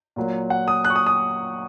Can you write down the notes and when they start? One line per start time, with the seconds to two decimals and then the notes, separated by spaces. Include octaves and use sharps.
0.16 A#2 F#3 A#3
0.50 F#5
0.68 D#6
0.85 F#6
0.90 C#6
0.96 D#6
1.06 D#6